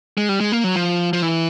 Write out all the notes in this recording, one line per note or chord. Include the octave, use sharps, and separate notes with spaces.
G#3
G3
G#3
A#3
F#3
F3
F3
E3